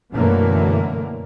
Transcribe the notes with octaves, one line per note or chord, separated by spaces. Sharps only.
F#2 B2 D3 E3 A3 A#3